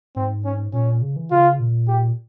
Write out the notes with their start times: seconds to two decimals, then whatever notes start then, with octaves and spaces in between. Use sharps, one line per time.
0.16 G#2 C4
0.45 C#4
0.73 A#2 C#4
1.02 C#3
1.16 E3
1.31 C#3 F4
1.60 A#2
1.88 G4